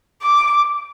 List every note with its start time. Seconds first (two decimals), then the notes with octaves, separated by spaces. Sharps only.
0.22 D6